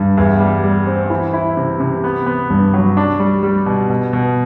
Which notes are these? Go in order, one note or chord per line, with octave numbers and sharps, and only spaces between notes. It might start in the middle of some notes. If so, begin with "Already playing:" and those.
Already playing: G2
E2
G3
G3
C4
E3
E4
C3
C3
B3
B3
G2
F#3
D4
G3
G3
B2
B2
B2